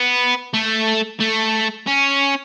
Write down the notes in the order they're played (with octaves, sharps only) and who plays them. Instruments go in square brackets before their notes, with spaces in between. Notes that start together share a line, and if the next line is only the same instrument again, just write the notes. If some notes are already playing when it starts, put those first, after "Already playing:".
Already playing: [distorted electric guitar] B3
A3
A3
C#4